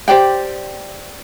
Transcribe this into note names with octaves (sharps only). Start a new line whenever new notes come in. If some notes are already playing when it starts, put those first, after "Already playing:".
G4 C5 D5 G5